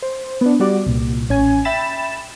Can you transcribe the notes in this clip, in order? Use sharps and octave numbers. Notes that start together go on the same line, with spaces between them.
C5
B3 D4
G3 F#4 D5
C2 A#2
A1 C#4 G#5
E5 G5 B5 A6 E7